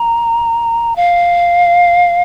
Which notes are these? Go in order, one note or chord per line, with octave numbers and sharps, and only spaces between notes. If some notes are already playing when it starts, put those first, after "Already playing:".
Already playing: A#5
F5